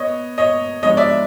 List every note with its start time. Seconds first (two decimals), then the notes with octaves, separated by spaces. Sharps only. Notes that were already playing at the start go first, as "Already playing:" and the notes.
Already playing: B3 C#5 D#5
0.38 C#5 D#5
0.82 G#2 F3 G#3 B3 D4 C#5 D#5
0.97 D5 E5